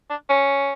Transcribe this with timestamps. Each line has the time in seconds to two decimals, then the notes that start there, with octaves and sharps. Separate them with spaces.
0.10 D4
0.29 C#4